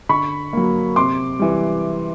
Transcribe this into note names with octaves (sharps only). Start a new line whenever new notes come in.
D3 B5 C#6
F#3 A#3
C3 C6 D6
E3 G3